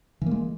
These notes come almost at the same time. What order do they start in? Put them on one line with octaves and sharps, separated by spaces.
E3 A#3 G#3